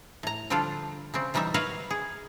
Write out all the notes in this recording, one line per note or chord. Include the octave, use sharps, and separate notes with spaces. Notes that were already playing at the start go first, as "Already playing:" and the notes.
A2 A#5
D3 F3 G3 D4 F4 A4
C#3 G3 C4
E3 F#3 G3 D#4 E5
F#4 A#4 B4 C#5 E5 F5
G#4